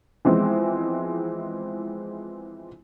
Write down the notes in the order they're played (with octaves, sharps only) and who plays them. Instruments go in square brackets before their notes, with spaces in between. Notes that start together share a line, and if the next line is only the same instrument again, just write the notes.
[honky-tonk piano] E3 F3 G#3 B3 C4